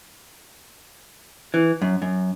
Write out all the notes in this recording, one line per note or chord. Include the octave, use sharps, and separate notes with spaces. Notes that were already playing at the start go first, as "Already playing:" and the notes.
E3
F#2
F#2